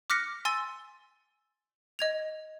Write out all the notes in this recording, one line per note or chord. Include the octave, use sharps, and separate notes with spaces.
D6 F6 F#6 A#6 B6 C#7
G#5 C6 E6 A6
D#5 G#6 F7